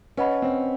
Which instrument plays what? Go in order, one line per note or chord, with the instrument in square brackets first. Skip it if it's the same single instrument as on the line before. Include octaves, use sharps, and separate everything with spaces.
[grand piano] C#4 [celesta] B4 D#5 F#5 B5
[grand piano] C4